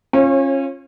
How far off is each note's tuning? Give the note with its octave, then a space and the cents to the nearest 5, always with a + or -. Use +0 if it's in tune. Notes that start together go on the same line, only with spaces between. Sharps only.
C#4 -25 F4 -5 C#5 -45